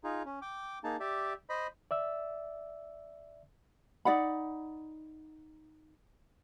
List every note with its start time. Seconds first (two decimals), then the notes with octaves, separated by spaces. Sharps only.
0.04 D#4 F4 G#4
0.25 C#4
0.42 G5 D6
0.84 A#3 D#4 G#4 A5
1.00 G4 D5 E5
1.49 C5 D#5 B5
1.91 D5 E5 E6
4.05 D#4 D5 F#5 B5